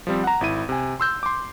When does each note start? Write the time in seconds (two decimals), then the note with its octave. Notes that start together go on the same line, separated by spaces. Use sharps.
0.07 F3 G3 C4
0.24 F#5 A#5
0.41 G#1 E4 D#7
0.69 C3 G#5
1.00 C6 E6 G6
1.23 C6 D6